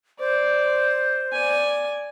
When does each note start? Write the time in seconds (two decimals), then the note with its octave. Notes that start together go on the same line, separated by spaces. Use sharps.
0.19 C5 D5
1.33 D5 G#5